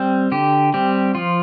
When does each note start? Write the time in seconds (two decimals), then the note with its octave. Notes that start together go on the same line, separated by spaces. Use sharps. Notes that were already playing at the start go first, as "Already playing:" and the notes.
Already playing: G3 C4
0.32 D3 G4
0.74 G3 C4 G4
1.15 F3 F4